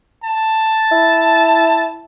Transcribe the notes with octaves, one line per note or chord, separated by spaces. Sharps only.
A5
E4